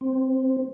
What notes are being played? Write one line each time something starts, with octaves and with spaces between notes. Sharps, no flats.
C4